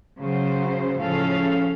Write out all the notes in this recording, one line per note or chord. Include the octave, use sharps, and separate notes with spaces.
C#3 F#3 C5
A2 C#3 F3 C#4 A4 F5